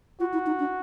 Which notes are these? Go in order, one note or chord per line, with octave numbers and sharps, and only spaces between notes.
F4 F#4
E4
D#4
D4